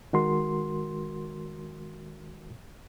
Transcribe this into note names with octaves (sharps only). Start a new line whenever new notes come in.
D#3 G#3 F#4 A#4 C6